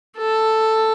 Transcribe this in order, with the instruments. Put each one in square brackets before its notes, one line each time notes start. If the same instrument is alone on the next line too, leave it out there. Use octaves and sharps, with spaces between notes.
[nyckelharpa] A4